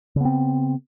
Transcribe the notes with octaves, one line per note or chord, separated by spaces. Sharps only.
C#3 B3 C4